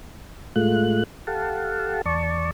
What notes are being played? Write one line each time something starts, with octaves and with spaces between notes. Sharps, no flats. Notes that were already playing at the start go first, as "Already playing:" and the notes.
A2 G#3 A3 F4 F#6
G4 A4 F5 F#5 A5
E2 D5 A5 C#6